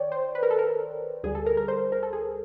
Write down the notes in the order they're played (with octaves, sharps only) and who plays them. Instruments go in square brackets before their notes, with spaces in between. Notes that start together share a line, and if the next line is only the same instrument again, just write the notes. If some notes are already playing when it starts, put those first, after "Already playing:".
Already playing: [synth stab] D#3 C#5 D5 G5
C5
B4
A#4
A4
A#4
D2 D3 G3 G#4
A4
A#4
A#4
C5
A#4
A4
G#4